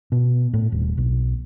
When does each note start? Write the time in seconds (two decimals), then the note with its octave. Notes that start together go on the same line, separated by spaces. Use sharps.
0.12 B2
0.54 A2
0.72 D#1
0.97 B1